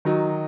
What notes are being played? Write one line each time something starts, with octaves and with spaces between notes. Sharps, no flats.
D#3 F#3 D#4